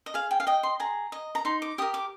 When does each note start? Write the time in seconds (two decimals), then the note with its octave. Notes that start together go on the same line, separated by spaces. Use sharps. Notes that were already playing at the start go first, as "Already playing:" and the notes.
0.06 D#5
0.14 G#4 F5
0.31 G5
0.40 F5
0.47 D#5 G5
0.63 C6
0.80 G#4 A#5
1.12 D#5
1.35 A#5
1.45 D#4 C6
1.62 D6
1.78 G4 A#4 D#6
1.94 D6